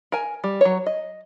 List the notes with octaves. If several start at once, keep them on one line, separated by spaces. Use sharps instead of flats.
A#4 G#5
G3
F#3 C#5
D#5